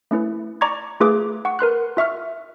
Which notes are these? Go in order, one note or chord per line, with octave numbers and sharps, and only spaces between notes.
A3 C#4 E4 B4
D5 A#5 C#6 D6 G#6
A3 F4 G#4 B4 D6
F#5 C#6
A#4 B4 C6 F#6
F4 E5 C#6 F6